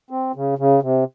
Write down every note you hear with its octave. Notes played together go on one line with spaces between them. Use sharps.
C4
C#3
C#3
C3